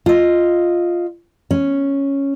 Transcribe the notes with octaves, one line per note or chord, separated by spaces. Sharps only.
F4 D#5
C#4